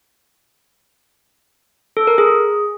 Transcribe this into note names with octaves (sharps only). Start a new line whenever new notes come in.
A4
A#4
G#4